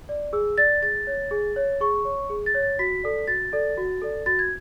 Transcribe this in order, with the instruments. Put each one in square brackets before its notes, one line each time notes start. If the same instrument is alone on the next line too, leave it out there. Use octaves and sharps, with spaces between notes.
[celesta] D5
G#4 E6
D5 A6
G#4 A6
C#5
G#4
C#5
G#4 C#6
C#5
G#4
A6
C#5
A6
F#4 B6
A4 D5
F#4 A6
A4 D5
F#4
A4 D5
F#4 A6
G#6